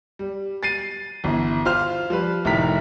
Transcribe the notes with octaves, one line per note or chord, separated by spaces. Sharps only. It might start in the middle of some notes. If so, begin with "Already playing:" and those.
G3
A6 C7 D#7
G1 E3
F4 C5 F6
F3 G3 B4
F1 A2 D#3 A#5 B6